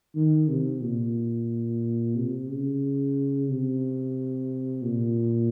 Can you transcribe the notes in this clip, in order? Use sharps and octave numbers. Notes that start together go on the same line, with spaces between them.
D#3
C3
A#2
C3
C#3
C3
A#2